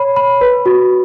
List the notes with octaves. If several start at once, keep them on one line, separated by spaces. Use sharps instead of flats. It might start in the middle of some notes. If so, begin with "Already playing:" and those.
Already playing: C#5 B5
B5
B4
F#4